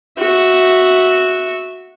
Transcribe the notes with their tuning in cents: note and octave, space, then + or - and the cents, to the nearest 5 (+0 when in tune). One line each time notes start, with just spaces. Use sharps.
F#4 -5 E5 -10